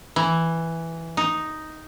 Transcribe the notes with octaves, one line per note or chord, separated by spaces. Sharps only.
E3
D#4